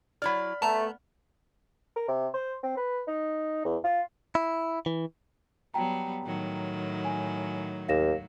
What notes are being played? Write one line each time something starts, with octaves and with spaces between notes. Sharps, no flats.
F#3 E4 D5 B5 F6
A3 B3 A5 A#5
A#4
C3
C5
C4
B4
D#4
E2
F4
E4
E3
F#3 G3 B3 G5 A5 A#5
A2 D#3 F#3
G#5
D#2 F5 A#6 E7